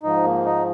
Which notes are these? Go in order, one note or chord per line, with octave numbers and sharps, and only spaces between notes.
G#2 F3 D#4
A#3
D#4